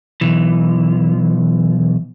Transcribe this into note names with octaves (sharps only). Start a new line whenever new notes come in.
B1 E3